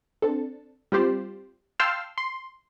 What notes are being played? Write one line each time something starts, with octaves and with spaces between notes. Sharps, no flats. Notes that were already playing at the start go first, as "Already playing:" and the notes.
C4 D4 A4
G3 C4 F4 G4 C5 D5
F5 G5 A5 C6 E6 F6
C6